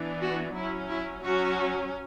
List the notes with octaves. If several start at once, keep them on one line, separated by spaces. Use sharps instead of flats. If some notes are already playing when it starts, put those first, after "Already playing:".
Already playing: E3 B3 D4
F#4
F#3 C#4 E4
E4
F#3 C#4 F#4